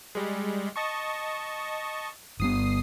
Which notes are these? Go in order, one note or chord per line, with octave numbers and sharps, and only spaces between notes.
G3 G#3
D#5 A5 C#6
G1 G3 B3 D#6 C7